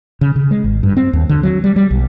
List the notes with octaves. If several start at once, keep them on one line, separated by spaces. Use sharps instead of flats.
C#3
C#3
G#3
G#1
G2
C4
D#2
D3
F#3
G3
G3
B1